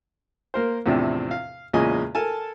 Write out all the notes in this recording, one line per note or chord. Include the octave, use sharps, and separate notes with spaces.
A#3 A#4 C5
E2 A2 C3 F3 C4 D4
F5
E2 A#2 C#3 G#3 D#5 G#5
A4 A#4 G#5 A5